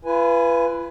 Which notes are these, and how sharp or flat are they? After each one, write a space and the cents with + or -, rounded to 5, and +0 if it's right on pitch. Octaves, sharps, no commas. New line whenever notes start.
F4 -45 B4 +0 G#5 +0